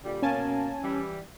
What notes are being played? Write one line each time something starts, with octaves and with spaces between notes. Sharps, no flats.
A#2 D3 G3
B2 A#3 C#4 G#5 A5
E3 G3